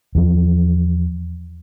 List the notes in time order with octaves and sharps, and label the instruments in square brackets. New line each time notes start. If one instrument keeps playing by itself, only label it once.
[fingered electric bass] E2 F3